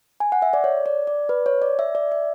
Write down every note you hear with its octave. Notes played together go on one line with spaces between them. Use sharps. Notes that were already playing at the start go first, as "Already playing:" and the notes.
G#5
F#5
E5
D5
C#5
D5
D5
B4
C#5
D5
E5
D5
E5